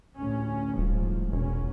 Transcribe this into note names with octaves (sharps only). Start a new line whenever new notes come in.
A1 D2 C#4
D#1 A1 G#2 F3
E1 E2 A#2 C#4